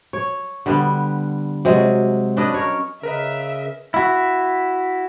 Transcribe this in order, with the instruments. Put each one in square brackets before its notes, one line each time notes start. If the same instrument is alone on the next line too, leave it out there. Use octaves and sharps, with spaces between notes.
[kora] C#5
D3 G3 B3
C3 F#3 G#3
C#4 D4 B4 D#5
A#4 C#5
[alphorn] C#3 [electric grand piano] A#4 B4 D#5 [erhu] E5
[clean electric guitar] E4 F#4